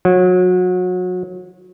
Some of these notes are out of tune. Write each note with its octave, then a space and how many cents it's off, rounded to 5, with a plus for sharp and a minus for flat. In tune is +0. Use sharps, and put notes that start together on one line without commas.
F#3 -30